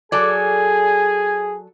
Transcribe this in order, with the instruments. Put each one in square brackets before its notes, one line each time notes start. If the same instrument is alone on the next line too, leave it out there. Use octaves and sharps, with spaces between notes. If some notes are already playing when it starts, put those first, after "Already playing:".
[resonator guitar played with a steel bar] F#3 A4 D5 [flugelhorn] G#4 [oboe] G#5